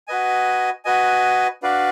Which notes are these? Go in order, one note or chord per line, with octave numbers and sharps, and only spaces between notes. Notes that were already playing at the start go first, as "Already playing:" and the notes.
F#4 B4 D#5 G#5
F#4 B4 D#5 G#5
D4 F#4 B4 D5 F5